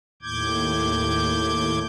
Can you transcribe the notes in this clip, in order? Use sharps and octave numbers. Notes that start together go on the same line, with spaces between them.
D#2 A2 D6 G6 G#6